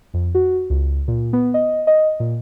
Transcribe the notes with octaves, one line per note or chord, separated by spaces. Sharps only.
F2
F#4
C#2
A#2
B3
D#5
D#5
A#2